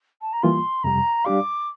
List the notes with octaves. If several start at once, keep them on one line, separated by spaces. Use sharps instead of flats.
A5
A#5
E3 G3 A#3 F4 C6
F2 C3 G3 A#5
G3 D4 G4 D5 F5 D6